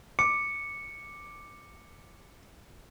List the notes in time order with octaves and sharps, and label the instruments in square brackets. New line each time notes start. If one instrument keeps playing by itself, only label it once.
[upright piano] D6 [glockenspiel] C#7